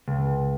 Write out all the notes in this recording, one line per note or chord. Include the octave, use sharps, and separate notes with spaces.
C#2